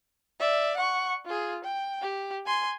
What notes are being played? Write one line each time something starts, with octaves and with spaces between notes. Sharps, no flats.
D5 E5
F#5 C#6
F4 G#4
G5
G4
G#5 C6